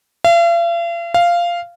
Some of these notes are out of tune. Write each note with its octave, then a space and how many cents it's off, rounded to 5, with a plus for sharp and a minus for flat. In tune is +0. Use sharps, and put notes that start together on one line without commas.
F5 -45
F5 -10